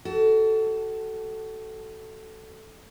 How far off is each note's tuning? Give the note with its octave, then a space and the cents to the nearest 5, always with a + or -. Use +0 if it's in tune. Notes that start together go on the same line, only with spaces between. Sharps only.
F#4 +35 A4 +0